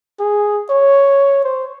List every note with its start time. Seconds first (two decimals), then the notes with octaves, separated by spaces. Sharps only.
0.20 G#4
0.70 C#5
1.44 C5